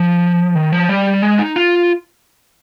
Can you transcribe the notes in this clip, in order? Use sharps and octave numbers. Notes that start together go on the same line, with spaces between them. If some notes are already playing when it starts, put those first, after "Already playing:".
Already playing: F3
D#3
F3
G3
G#3
D#4
F4